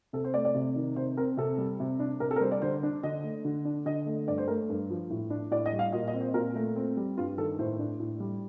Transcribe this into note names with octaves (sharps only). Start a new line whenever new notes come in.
C3 A4
C5
A3 D5
D5
C3
D#3
C3 C5
C4 A#4
C3 A4
G3
C3
D4
C3 A#4
A4
A#4
G3 C5
D5
D3 C5
D4
D3 D#5
A3
D3
D4
D3 D#5
A3
G2 D5
C5
A3 A#4
G2
F3
A2
D4
A2 D5
D#5
G3
F5
A#2 D#5
D#5
C4
C5
A#2 A#4
A3
C4
G3
G2 F4
D#3 A4
A2 C5
D4
A2
G3